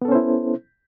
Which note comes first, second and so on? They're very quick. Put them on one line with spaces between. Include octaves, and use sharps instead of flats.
B3 A4 C#4 C5 E4